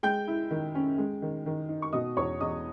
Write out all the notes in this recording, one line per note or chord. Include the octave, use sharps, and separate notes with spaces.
G#3 G5 G6
E4
D#3
C#4
G#3
D#3
D#3
D#4
C#6
B2 D#5 D#6
E2 C#5 C#6
E2 D#5 D#6